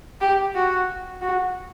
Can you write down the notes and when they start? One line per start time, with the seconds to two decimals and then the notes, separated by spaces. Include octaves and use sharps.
0.20 G4
0.55 F#4
1.21 F#4